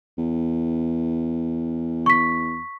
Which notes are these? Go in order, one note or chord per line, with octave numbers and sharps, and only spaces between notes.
E2
C#6 B6